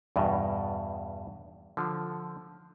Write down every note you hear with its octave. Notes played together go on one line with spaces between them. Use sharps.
E2 G2 B2
D3 F3